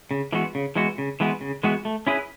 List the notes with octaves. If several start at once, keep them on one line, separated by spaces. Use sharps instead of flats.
C#3
E3 G#3 B3 F#4
C#3
E3 G#3 B3 F#4
C#3
E3 G#3 B3 F#4
C#3
E3 G#3 B3 F#4
A3
C#4 E4 G#4 B4